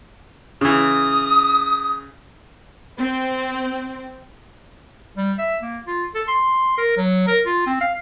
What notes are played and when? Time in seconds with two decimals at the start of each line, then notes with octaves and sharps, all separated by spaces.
0.61 C#3 E3 D#6
3.00 C4
5.17 G3
5.38 E5
5.62 A#3
5.87 F4
6.14 A4
6.28 C6
6.78 A#4
6.97 F#3
7.27 A#4
7.46 F4
7.66 C4
7.81 F5